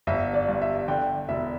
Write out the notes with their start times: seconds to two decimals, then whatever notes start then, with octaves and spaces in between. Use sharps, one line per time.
0.07 G1 E5
0.34 D5
0.48 G2
0.61 E5
0.88 D3 G5
1.29 E1 E5